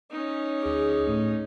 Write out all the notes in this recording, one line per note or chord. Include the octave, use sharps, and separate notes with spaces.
C#4 D#4
D2 G#4 D6
A2 A3